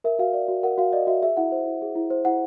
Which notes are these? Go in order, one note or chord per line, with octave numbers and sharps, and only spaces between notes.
A#4 E5
F#4 F5
D5
F#4
A#4 F#5
F#4 F5
D5 D#5
F#4 E5
G#4 E5
E4 F#5
C5
E4
G#4
E4
C5
E4 F#5